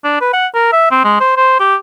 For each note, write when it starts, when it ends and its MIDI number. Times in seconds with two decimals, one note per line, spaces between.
0.04 0.19 62
0.21 0.32 71
0.33 0.47 78
0.54 0.70 70
0.73 0.88 76
0.91 1.04 60
1.04 1.20 56
1.20 1.34 72
1.37 1.60 72
1.60 1.75 67